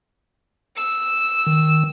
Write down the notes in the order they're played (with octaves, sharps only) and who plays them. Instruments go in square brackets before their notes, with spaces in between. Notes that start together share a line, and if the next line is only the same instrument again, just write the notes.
[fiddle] E6
[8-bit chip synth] D#3